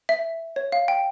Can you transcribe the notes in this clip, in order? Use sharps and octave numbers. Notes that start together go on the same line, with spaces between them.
E5
C#5
F5
G5